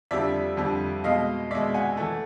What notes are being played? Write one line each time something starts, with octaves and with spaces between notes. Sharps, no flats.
F2 D3 G3 D5 E5
F2 D3 G3
B2 G#3 D#5 F5
B2 G#3 D5 E5
F#5 G#5
E3 A3